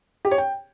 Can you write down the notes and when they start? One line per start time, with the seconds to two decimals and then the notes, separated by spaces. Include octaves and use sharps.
0.25 G4
0.31 C#5
0.38 G5